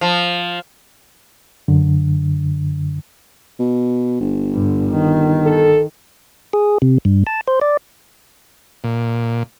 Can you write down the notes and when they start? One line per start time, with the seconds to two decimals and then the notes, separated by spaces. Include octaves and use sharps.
0.01 F3
1.68 F#2 D3
3.59 B2
4.20 G1
4.53 G2 D3
4.89 D#3
5.44 A4
6.53 G#4
6.82 C3
7.05 G2
7.27 A5
7.48 C5
7.61 D5
8.84 A#2